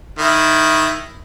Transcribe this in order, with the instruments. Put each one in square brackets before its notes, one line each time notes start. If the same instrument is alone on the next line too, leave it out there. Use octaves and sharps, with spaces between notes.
[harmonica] D#3 E4